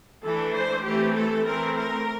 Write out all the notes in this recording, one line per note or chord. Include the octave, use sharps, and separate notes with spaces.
E3 A3 D4 A4
C5
E3 A3 C4 G4
A4
E3 A3 C4 A#4
A#4